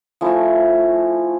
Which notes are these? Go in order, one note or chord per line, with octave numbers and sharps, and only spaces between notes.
F3 A3 C#4 E4